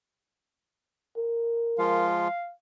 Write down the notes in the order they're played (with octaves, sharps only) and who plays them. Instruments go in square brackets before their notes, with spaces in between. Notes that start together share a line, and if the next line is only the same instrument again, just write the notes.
[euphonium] A#4
[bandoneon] F3 G#3 F4 [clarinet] F5